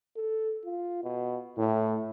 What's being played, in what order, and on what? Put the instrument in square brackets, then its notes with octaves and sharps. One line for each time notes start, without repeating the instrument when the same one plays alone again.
[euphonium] A4
F4
B2
[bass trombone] A2 [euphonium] E4